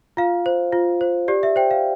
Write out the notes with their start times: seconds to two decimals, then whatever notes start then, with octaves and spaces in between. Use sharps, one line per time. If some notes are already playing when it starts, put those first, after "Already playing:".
0.17 F4 F5
0.46 C5
0.73 F4
1.01 C5
1.28 G4 D5
1.43 E5
1.56 C5 G5
1.71 F5